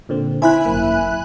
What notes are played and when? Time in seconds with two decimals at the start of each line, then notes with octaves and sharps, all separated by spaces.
0.09 A#2 D3 C4
0.42 E4 C5 G#5 B5 F#6
0.65 G#1 F#2 A#3